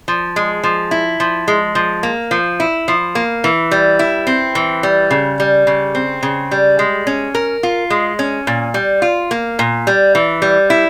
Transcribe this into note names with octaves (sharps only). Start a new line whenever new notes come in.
F3
G#3
F3
E4
F3
G#3
F3
A#3
F3
E4
F3
A#3
E3
G3
E4
C4
E3
G3
C#3
G3
C#3
C4
C#3
G3
G#3
C#4
A#4
F4
G#3
C#4
A#2
G3
F4
A#3
A#2
G3
E3
G3
E4